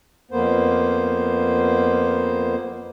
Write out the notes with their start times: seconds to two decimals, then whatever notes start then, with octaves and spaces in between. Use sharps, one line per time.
0.31 F2 A#3 B3 C5